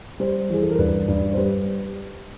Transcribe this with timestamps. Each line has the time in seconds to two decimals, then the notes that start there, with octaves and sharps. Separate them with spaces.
0.20 G3 C5
0.50 E3 G#4
0.63 A4
0.70 A#4
0.79 G2 B4
1.08 G2
1.33 C5
1.37 G3 B4